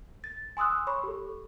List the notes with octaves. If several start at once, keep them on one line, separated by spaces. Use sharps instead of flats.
A6
G#5 C6 D#6 E6 F#6
C#5 B5 C#6
G4 A4